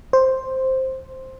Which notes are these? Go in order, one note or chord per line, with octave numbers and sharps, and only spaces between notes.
C5